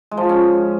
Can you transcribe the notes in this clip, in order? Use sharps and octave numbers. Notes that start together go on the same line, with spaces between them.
G#3
F3
G#3
C#4